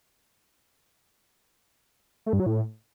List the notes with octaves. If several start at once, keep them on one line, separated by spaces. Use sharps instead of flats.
A3
G2
F#3
A2